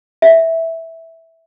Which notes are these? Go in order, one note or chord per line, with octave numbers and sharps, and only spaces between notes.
E5